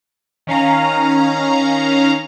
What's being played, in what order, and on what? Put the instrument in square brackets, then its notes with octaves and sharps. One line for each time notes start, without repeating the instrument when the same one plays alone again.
[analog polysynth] D#3 C#4 F5 A#5